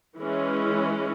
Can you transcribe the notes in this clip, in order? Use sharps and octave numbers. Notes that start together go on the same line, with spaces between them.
E3 G#3 C#4